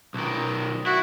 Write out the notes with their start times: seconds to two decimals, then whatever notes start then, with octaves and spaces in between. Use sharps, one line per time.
0.14 B1 D#3
0.86 E4 F#4